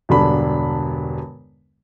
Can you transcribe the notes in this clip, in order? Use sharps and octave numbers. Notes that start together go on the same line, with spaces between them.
E1 G2 D3 D4 B5